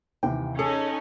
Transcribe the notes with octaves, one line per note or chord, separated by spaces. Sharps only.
D#2 C3 E3 G5
C#4 D#4 G#4 A4 C#7